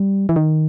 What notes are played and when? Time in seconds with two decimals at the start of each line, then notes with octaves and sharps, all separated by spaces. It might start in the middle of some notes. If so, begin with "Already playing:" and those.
Already playing: G3
0.29 E3
0.36 D#3